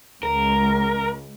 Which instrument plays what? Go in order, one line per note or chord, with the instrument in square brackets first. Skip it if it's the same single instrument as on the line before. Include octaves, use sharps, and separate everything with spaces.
[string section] C#2 [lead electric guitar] A#4